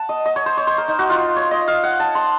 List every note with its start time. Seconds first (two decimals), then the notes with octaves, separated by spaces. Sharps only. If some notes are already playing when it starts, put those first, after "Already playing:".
Already playing: F#5 A5
0.09 D#5
0.25 D#5
0.36 C#5
0.46 C5
0.57 C#5
0.67 C5
0.78 A#4
0.88 D#4
0.99 F#4
1.10 F4
1.36 C#5
1.51 D#5
1.68 F5
1.83 F#5
2.00 A5
2.15 C6